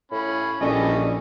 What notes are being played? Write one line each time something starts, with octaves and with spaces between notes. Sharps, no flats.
A2 C#4 B5
A#1 E3 G3 A3 C#4 D#5